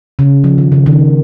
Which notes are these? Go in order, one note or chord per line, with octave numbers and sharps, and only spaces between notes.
C#3
F3
D#3
C#3
D#3